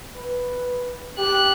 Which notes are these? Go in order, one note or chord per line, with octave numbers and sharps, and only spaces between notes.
B4
G4 F#6